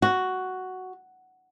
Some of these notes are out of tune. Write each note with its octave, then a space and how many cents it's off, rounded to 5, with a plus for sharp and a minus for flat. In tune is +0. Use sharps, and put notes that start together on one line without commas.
F#4 +5